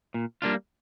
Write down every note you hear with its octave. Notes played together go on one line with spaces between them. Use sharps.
A#2
G3 A#3 D4 F4